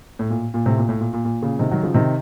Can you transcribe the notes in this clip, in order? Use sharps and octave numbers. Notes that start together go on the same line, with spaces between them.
A2
A#2
A#2
A2 C3
A#2
A2
A#2
A#2
A#2
A#2 C#3
C3 D#3
D#3 F#3
C#3 F3
C3 D#3